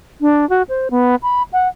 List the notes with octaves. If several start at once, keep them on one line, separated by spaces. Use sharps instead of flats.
D4
F#4
C5
B3
B5
F#5